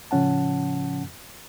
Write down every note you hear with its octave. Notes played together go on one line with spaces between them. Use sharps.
A2 C#3 F3 C#4 F#5 A5